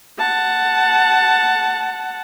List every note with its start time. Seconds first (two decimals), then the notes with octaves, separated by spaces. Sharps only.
0.19 F#5 A5